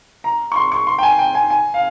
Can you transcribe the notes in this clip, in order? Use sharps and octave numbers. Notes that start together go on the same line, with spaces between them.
A#5
C#6
C6
C#6
C6
G5
G#5
G5
G#5
G#5
F5